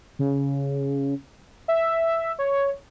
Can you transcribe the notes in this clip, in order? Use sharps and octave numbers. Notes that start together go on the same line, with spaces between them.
C#3
E5
C#5